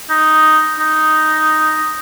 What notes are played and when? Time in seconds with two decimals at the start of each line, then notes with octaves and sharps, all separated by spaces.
0.10 D#4
0.79 D#4